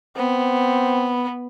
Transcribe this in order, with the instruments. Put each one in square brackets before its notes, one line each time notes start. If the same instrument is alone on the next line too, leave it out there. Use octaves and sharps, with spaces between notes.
[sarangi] B3 [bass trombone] C4